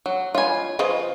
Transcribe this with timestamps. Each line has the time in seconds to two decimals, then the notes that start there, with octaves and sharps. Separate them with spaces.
0.06 F#3
0.35 F4 C#5 D#5 G#5 B5
0.79 C#3 F3 F4 B4 C5 D#5